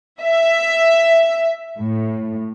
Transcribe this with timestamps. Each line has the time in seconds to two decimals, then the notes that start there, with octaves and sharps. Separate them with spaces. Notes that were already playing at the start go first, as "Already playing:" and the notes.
0.21 E5
1.78 A2